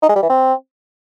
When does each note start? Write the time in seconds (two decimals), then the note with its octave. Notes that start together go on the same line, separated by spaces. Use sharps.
0.02 D#4
0.09 G#3
0.16 G3
0.23 E3
0.29 C4